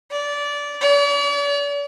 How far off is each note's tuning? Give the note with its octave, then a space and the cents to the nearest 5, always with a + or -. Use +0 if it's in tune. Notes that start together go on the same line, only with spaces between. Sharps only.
D5 -20
D5 -45